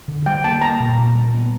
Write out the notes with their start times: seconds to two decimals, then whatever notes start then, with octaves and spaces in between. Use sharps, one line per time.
0.08 D3
0.26 G3 G5
0.44 A#3 A5
0.62 A#3 A#5
0.80 A#2
0.98 A#2
1.15 G3
1.34 B3